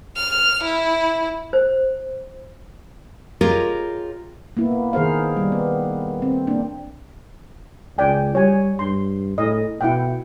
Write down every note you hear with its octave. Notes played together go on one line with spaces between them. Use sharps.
F6
E4
C5
F4 G4 G#4 A#4 C#5 D#5
A#3 B3 E4
D#3 G#4 A#4 C5 F5
G3
B3
C4
A#3 D4
C#2 D5 G5 G#5
G3 C#5 G#5
G2 C6
A2 D#5
B2 E4 F#5 G5